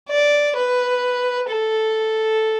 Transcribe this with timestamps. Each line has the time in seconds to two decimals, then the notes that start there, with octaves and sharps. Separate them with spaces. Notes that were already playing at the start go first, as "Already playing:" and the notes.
0.09 D5
0.56 B4
1.49 A4